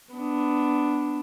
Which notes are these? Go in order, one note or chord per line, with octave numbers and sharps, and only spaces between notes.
B3 D4